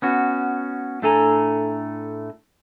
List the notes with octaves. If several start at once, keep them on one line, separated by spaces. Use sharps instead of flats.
B3 C#4 F#4
A2 A3 D4 A4 G#5 A#5